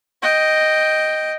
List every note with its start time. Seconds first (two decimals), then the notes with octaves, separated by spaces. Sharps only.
0.22 D#5 G5